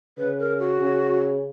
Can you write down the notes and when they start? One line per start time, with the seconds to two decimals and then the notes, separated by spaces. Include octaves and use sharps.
0.18 C#3 B4
0.39 A#4
0.59 F#4
0.81 C#3